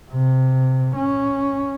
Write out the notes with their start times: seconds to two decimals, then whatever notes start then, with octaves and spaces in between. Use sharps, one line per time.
0.11 C3
0.96 C#4